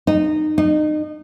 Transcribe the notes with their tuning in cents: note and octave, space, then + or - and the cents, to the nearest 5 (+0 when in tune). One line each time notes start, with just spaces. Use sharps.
D#4 -20
D#4 -30